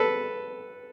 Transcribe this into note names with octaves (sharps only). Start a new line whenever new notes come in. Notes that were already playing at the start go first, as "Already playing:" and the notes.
Already playing: A4 B4